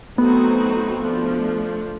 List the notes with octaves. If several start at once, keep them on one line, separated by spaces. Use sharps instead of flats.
F#3 A3 B3 C4 D#4 F#4
F3 A3 D4